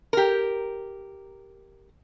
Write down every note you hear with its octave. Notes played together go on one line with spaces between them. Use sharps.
G4 A#4